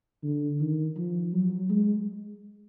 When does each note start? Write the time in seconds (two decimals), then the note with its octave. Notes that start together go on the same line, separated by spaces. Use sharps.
0.23 D3
0.60 D#3
0.96 F3
1.33 F#3
1.69 G#3